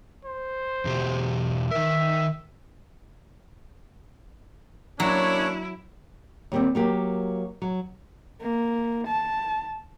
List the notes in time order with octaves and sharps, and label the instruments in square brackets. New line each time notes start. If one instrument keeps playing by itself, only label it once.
[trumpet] C5
[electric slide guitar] E2 B2 G4
[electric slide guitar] D#3 A#4 [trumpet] E5
[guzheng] F#3 [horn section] A#3 C#4 D4 [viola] E4 [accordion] C#5
[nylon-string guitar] D#2 G3 C4
F#3 A#3 G4
F#3
[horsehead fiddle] A#3
A5